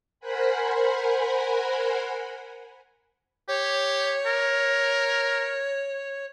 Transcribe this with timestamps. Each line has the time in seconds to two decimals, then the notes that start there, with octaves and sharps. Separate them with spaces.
0.20 A#4 C5 F#5 G#5 B5
3.48 G4 C#5
4.25 A#4